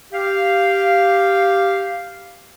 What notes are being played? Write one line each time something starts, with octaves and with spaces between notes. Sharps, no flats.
G4 F5